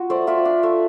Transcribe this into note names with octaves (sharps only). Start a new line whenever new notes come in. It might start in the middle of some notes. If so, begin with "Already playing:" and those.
Already playing: F4 F#4
A3 C5 D5
F4 D5 E5
D4
A3